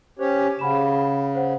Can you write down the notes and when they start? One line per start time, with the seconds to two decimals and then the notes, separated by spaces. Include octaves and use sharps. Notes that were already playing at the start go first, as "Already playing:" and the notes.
0.19 C#4 G4 C5 C#5
0.59 C#3 F#5 B5 E7
1.35 C5 F#5